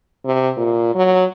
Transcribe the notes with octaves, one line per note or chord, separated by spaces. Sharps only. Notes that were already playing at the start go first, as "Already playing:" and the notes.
C3
A#2
F#3